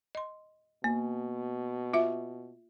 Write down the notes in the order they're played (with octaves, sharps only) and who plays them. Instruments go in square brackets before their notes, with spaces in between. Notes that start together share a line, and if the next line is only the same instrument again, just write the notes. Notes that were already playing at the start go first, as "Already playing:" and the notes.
[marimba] D#5 C6
[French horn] B2 [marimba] A#3
[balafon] F4 E5